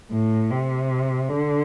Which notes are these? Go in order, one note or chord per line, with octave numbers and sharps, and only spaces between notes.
A2
C3
D3